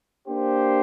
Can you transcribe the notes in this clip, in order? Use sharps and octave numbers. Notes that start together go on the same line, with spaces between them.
A#3 D4 G4 C5